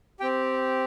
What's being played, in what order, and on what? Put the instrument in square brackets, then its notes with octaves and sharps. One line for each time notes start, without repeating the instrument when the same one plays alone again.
[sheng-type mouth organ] G4 G5
C4